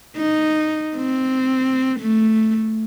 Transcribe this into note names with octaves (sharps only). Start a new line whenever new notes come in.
D#4
C4
A3